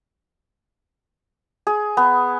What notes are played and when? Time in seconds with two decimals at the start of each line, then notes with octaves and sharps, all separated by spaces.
1.67 G#4
1.97 B3